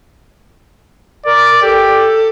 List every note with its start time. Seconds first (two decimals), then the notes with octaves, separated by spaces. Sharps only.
1.26 A#4 D5
1.62 G4 A4